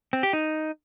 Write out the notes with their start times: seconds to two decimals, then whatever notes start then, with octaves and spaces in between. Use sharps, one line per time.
0.13 C4
0.23 G4
0.33 D#4